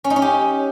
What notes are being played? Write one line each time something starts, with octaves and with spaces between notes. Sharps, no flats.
C#4
D#4
C#4
G4